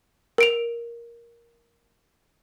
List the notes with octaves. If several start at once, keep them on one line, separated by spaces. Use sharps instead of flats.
A#4 D7 F7